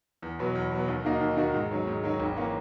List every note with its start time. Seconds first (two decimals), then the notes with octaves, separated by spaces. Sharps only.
0.22 E2
0.39 B2 F#3 B3
0.55 E2
0.71 B2 F#3 B3
0.88 D#2
1.05 D#3 A#3 D#4 F#4
1.21 D#2
1.37 D#3 A#3 D#4 F#4
1.54 G#2
1.71 D#3 F#3 C#4
1.87 G#2
2.04 D#3 F#3 C#4
2.20 G#1
2.36 E3 A#3 C#4